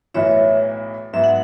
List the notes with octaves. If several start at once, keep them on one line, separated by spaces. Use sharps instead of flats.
B1 A2 E3 B3 E4 C#5 E5
G#2 F#3 B3 E5
F#5